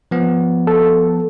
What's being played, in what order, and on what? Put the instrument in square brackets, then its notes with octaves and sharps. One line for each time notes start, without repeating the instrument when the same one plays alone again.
[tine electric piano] F3 B3
[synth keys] A4